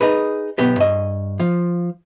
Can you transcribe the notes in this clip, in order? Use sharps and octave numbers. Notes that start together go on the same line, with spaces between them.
D#4 G#4 B4
B1 B3 G4 B4
G2 D#5
F3 F5